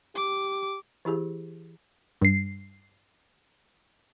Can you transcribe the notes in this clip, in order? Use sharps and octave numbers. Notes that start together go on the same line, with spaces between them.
G4 D6
E3 E4 G4 G#4
G2 C7